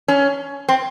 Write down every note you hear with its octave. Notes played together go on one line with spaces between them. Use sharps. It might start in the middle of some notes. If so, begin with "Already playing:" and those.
C#4
C4